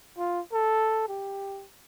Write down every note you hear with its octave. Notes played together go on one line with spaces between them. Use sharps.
F4
A4
G4